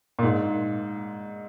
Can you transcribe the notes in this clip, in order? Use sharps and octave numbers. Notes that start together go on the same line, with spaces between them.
A#2
G#2